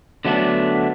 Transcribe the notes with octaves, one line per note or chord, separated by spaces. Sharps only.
D3 F#3 A3 B3 D4